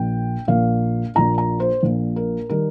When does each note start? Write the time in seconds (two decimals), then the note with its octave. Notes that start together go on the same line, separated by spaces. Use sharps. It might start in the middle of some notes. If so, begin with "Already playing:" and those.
Already playing: A#1 A#2 A#3 G5
0.48 A#1 A#2 A#3 F5
1.15 A#1 A#2 A#3 A#5
1.38 A#5
1.60 C5
1.83 A#1 A#2 A#3
2.16 A#4
2.49 D#3 G3 A#4